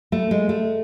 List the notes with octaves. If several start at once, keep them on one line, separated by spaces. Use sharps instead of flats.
A3
G#3
A3